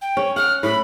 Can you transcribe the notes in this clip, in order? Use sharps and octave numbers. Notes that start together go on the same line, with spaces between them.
G5
C#4
F#5 F6
A2 B5